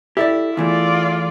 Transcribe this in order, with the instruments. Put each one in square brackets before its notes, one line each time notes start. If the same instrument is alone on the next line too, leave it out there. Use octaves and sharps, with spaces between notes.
[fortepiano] E4 [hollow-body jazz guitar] G4 A4 D5
[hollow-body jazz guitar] E2 E3 A3 [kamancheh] F4 D5